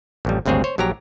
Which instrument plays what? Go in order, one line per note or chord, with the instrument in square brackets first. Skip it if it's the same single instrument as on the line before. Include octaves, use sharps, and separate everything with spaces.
[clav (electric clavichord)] A1 F2 G3
G#1 D2 G2 C4 G#4 C#5
C5 C#5
A#1 F#3 G4 A#4 A#5